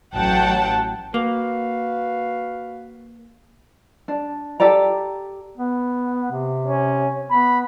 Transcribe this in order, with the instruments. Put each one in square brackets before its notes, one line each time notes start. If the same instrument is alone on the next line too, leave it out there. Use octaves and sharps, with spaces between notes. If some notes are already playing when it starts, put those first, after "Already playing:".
[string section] A1 F#3 F#5 G5 A5
[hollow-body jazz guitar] A#3 [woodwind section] F#4 B4 F5
[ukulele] D4
G4 A4 D5 A#5
[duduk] B3
C3
[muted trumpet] C#4
[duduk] B3 [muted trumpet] B5